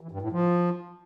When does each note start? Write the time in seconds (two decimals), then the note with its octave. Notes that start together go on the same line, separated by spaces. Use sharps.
0.01 E3
0.11 G2
0.22 A2
0.32 F3